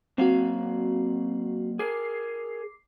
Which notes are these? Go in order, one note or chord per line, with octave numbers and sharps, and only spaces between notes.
F#3 A#3 C4 F#4 F5
G#4 A#4 D6 C7